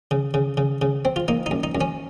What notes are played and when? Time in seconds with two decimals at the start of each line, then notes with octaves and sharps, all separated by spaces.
0.11 C#3
0.34 C#3
0.57 C#3
0.82 C#3
1.05 C4
1.16 F4
1.28 A#3 D#4
1.46 D#4
1.51 F#2
1.63 D#4
1.75 F#2
1.81 C#4